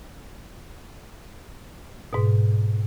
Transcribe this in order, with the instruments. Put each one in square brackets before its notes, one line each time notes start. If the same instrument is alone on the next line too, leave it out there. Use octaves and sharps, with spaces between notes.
[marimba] G#2 B2